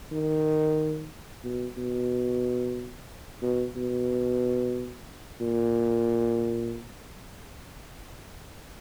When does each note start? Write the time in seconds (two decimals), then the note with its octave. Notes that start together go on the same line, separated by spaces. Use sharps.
0.12 D#3
1.44 B2
1.78 B2
3.42 B2
3.76 B2
5.41 A#2